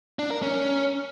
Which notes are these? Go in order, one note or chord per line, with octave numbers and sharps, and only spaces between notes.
D4
A#4
C#4